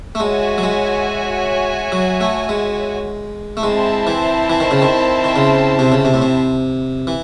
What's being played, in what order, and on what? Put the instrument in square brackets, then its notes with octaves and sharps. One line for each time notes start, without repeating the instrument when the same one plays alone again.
[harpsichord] A3
[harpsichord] G#3 [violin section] F#4 C#5 E5 G#5
[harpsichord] F#3
G#3
F#3
A3
G#3
A3
[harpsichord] G#3 [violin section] C4 E4 C5 E5 A5
[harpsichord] E3
E3
D#3
C#3
D#3
D#3
C#3
C3
C#3
C3
A2
C3
E3